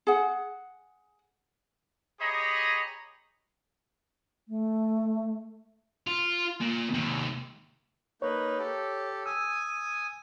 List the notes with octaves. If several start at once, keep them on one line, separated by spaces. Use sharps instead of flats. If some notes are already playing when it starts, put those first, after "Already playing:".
G#4 F#5
G4 G#4 C#5 D#5 A#5 B5
A3
F4
A#2
D#2 C3
A#3 D#4 B4 C#5
G4 A4
G#5 D#6 E6